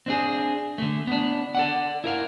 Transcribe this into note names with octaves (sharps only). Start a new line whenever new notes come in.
C4 D4 G#4
D3 A3
B3 D4
A4 D5 F#5
E4 A#4 F5